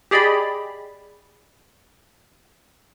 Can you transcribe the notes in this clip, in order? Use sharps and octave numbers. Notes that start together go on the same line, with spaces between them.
G4 G#4 D5 D#5 G5 B5